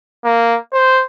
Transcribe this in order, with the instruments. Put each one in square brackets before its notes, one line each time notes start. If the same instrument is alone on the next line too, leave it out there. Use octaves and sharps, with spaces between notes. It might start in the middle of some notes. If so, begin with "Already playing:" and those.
[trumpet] A#3
C5